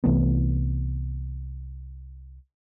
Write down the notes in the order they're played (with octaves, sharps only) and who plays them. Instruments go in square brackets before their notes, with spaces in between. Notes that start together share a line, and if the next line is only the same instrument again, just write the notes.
[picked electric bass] C2 E3 A3 B3